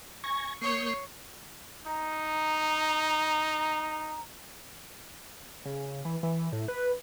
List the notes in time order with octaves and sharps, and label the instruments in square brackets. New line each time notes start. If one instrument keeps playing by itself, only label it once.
[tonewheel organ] G#5 G#6 A#6 [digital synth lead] C#6
[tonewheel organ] A#3 D#6 G6 [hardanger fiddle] C#5 C#6 [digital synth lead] C7
[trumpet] D#4 [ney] A#5
[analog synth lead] C#3
E3
E3
A2
B4